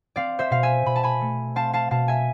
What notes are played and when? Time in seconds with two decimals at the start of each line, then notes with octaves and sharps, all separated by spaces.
0.16 C4 D5 F5
0.39 C5 E5
0.51 B2 F5
0.63 E5 G#5
0.86 B2 B5
0.96 A5
1.03 G#5 B5
1.21 A3
1.56 C4 F5 A5
1.73 F5 A5
1.91 B2 F5 A5
2.08 E5 G#5